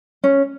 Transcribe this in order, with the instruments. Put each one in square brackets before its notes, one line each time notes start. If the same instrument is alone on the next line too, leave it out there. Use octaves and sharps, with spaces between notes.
[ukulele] C#4